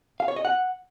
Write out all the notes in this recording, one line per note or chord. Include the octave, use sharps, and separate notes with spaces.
F5
C#5
D#5
F#5